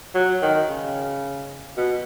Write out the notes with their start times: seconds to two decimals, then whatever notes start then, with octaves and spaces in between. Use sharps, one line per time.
0.14 F#3
0.42 D#3
0.69 C#3
1.77 B2